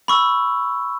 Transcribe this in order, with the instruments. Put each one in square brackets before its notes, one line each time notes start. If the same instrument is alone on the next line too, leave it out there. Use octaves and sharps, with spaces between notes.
[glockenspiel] B5 C#6 E6